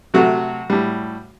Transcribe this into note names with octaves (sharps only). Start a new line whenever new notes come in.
C3 F#3 A3 F#4
A2 G3